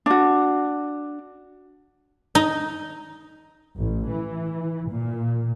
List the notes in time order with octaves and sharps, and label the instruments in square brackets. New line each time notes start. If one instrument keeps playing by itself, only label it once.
[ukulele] D4 F#4
[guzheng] D#4
[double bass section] A1
E3
A#2